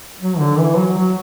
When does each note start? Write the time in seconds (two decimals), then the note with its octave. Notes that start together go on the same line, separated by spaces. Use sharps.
0.20 F#3
0.39 D3
0.59 E3
0.77 F#3
0.97 F#3